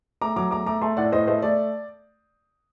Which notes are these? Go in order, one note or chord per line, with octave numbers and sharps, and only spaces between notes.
A3 A#5 D6
F#3 A#5 D6
A3 A#5 D6
A3 A#5 D6
A3 A5 C6
A2 D5 F#5
A2 C5 D#5
A3 C5 D#5
A3 D5